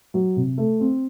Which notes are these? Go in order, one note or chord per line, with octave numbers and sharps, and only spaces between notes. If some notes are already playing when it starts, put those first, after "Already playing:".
F#3
C3
A3
C4